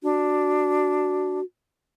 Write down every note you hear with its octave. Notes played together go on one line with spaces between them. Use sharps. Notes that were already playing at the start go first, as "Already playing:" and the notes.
D4 F#4